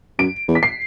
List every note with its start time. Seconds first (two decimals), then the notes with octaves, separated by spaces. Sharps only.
0.19 F#2 D7
0.48 E2
0.55 B6
0.63 C7